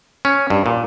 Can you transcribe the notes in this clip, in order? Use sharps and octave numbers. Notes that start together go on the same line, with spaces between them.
C#4
G2
A#2